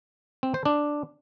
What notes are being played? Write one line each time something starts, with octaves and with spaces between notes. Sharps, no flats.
C4
C5
D4